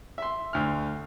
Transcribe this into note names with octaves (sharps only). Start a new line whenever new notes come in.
E5 C6
D2 F6